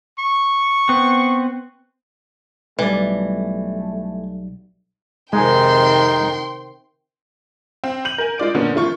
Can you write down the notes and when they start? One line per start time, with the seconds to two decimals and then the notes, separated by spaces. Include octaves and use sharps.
0.19 C#6
0.89 B3 C4
2.79 B1 E3 G3 A3 D5
5.33 F2 C3 D#3 G#3 D#4 G5 G#5 C6
7.84 C4
8.05 G6 D#7 F7 F#7
8.18 A#4 G#5
8.38 G#3 F4 D5 D7
8.54 F#2 A#2 D3 A#3 B3 C#4
8.74 G#1 E3 A3 F4 C#6